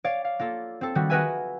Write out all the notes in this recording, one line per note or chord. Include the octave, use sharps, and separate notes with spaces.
C#5 D5 F5
F5
A#3 F4 A4
C4 A4
D#3 G3 F#4
F#4 G#4 A#4 B4 E5 G#5